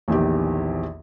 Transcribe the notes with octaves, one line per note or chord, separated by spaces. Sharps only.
A#1 E2 D#3 G4